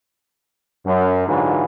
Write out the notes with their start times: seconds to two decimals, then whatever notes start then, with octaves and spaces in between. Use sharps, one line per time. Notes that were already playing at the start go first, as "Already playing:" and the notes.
0.85 F#2
1.27 G#2 D3 E3 F#3 F4